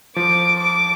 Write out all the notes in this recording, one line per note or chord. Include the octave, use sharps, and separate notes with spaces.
F3 D6
D6